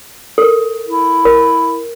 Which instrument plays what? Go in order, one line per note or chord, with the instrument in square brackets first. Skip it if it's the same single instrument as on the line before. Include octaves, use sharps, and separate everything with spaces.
[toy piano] A4 A#4
[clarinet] E4
[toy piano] A#4